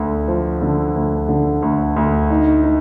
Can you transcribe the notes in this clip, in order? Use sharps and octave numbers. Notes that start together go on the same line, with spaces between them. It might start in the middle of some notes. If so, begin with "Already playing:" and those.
Already playing: D2 D3
F3
D3
D2
D3
D2
D2
D#4
D#4